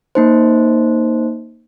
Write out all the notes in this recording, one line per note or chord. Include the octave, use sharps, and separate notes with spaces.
A#3 D#4 C5